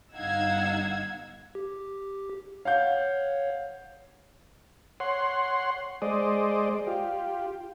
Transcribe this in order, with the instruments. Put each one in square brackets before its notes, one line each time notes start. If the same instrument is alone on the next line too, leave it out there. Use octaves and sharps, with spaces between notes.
[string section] G1 D#4 F5 F#5 E6 G#6
[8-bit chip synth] G4
[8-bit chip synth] C#5 [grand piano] F5 F#5 G6
[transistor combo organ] C#5 F#5 C6
G#3 C5 D5 D#5
F4 G4